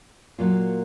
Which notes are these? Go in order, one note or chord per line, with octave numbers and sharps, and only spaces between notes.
A#2 F#3 A#3 F4